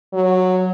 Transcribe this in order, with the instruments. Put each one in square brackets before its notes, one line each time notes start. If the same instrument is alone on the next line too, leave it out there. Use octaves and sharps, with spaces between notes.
[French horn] F#3